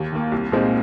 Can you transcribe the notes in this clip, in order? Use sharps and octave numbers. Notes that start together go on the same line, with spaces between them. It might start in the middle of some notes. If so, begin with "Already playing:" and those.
Already playing: D#2
D#3 A#3
C2
A#2 G#3 C4 D#4